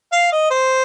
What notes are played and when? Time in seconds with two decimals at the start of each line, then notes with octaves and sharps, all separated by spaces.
0.12 F5
0.32 D#5
0.51 C5